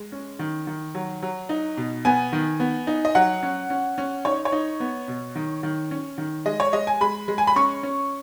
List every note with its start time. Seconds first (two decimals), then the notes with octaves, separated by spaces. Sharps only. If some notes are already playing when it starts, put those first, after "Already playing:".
Already playing: G#3
0.12 C#4
0.39 D#3
0.67 D#3
0.95 F#3
1.22 F#3
1.49 D#4
1.77 B2
2.05 B3 G#5
2.33 D#3
2.60 B3
2.87 D#4
3.05 D#5
3.15 F#3 F#5
3.43 C#4
3.70 C#4
3.98 C#4
4.25 D#4 C#5
4.45 C#5
4.52 D#4
4.80 B3
5.08 B2
5.35 D#3
5.63 D#3
5.91 C#4
6.18 D#3
6.46 G#3 D#5
6.60 C#5
6.73 G#3 D#5
6.87 G#5
7.01 G#3 B5
7.28 G#3
7.38 G#5
7.47 B5
7.56 C#4 C#6
7.83 C#4